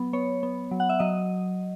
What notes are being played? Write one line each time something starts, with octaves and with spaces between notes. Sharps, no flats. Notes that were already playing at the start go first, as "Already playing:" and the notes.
Already playing: F#3 B3
B3 C#5
B3
F#3
F#5
E5
F#3 D#5